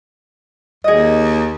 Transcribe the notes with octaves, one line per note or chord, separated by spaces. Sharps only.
D#2 G#4 D#5